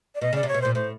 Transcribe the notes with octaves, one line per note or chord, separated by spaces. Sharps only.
D5
B2 D#5
C#3 D5
C3
C#5
B2
A#2 C5
A2 C5